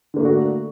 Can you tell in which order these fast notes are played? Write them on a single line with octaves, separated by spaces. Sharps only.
D3 A#3 A3 D4 F#4